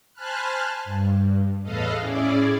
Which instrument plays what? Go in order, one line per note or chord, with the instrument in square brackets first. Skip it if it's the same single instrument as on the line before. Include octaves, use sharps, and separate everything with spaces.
[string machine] C5 G#5 A5 B5 F6 F#6
G2
E2 A2 A4 B4 D#5 F5
A2 C#4 E4 G#4 D5